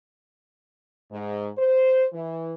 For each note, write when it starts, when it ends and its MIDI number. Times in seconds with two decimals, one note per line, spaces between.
1.11 1.49 44
1.58 2.05 72
2.13 2.55 52